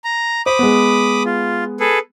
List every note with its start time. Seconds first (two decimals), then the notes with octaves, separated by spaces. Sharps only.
0.04 A#5
0.46 C5 B5 D6 D#6
0.59 G#3 B3
1.26 F4
1.80 G#4 A4 B4